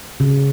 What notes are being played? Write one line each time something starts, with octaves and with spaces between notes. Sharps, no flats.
C#3